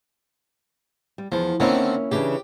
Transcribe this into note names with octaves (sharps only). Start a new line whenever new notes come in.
G3
E2 F3
D3 D#3 A#3 C4 C#4 E4
C#3 E3 D4 G4